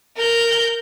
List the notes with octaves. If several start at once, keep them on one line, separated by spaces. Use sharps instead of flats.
A#4 G6